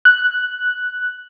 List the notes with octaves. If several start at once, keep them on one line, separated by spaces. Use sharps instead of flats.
F#6